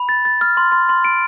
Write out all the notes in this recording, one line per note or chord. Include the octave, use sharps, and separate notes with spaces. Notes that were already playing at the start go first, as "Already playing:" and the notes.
Already playing: B5
A6
A6
F6
C6
C6
C6
D7